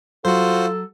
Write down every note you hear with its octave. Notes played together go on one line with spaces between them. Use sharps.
F#3 F4 F#4 A4 C5